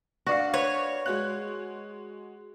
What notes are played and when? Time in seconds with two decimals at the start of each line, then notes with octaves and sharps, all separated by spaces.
0.26 D4 F#4 D5 F5
0.54 B4 C#5
1.06 G#3 F#4 F#6